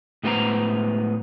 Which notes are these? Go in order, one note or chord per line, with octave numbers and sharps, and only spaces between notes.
A2 G#3 B3 F4 C5 A#5